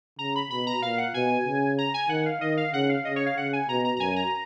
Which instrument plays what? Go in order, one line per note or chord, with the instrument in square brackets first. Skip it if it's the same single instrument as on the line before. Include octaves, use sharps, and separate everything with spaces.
[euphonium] C#3 [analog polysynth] A#5
[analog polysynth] B5
[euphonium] B2 [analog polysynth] B5
[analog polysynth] A#5
[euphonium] A#2 [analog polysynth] F5
[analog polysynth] F#5
[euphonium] B2 [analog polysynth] G#5
[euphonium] C#3
[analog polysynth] A#5
G#5
[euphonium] D#3 [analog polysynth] F#5
[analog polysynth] F5
[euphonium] D#3 [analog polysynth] D#5
[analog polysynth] F5
[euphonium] C#3 [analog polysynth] F#5
[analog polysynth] F5
[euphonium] C#3 [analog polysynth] D#5
[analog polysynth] C#5
F5
[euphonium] C#3 [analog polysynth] F#5
[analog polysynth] G#5
[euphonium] B2 [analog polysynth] A#5
[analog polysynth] A#5
A#5
[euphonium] F#2 [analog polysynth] G#5
[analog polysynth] A#5